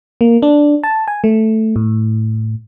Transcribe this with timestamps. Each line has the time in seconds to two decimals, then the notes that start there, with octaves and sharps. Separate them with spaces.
0.21 A#3
0.42 D4
0.83 A5
1.08 G#5
1.24 A3
1.76 A2